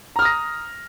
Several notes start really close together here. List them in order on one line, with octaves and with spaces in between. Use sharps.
A#5 F6 D#6 A#6